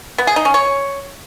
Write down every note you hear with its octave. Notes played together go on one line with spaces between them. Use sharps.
B3
G#4
D#4
C#4
C#5